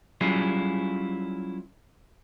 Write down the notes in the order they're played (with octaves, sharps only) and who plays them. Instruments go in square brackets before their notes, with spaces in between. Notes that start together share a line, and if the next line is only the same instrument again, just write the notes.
[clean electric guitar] F#3 G3 C#4 E4 F4 G#4